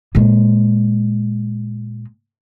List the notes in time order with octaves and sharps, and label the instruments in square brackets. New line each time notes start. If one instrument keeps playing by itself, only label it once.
[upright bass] A#2 G#3